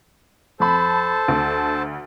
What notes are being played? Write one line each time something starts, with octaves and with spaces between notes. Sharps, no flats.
F2 A4 C5 A5 B5
D2